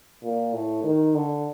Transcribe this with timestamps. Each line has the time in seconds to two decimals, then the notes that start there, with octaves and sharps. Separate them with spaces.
0.23 A#2
0.53 A2
0.83 D#3
1.15 D3